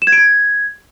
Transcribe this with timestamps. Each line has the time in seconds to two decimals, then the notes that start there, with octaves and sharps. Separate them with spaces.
0.02 E7
0.07 G#6
0.12 D7
0.18 G#6